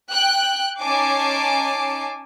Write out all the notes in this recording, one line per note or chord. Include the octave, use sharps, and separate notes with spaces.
G5 F#6
C#4 D#4 G#5 A5 D6 C7